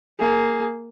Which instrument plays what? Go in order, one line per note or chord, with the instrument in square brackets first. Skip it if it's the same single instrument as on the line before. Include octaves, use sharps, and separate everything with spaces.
[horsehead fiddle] A#3 G#4